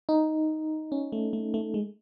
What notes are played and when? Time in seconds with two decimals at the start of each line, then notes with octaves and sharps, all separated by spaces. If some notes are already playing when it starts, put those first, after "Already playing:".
0.09 D#4
0.92 C#4
1.12 A3
1.33 A3
1.54 A3
1.74 G#3